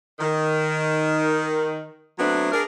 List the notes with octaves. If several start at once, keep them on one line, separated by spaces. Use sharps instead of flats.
D#3
F#3 A3 B3 C4 D4
D4 G#4 A#4